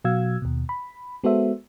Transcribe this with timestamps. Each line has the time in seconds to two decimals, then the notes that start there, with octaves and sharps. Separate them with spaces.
0.05 B2 F#3 F#4 F5 E6 G#6
0.42 D#2 B2
0.69 B5
1.24 G#3 B3 F#4 A4 C5 E5